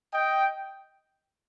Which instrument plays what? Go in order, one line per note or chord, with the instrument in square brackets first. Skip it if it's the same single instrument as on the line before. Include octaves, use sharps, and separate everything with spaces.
[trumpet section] D#5 G5